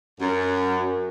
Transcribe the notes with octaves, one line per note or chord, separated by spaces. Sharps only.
F#2